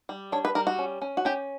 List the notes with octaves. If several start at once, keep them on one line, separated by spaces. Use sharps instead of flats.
G3
D4 C#5
B4
G3 A#4
F#4
C#4
C#4
F#4
C#4 G4